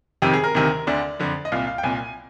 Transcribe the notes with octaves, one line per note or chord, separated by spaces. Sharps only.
F2 C3 D#3 G4
G#4
A#4
D2 C3 D#3
D2 D3 D5
F2 D3
D#5
C2 A#2 F5
F5
G5
C2 A#2 G#5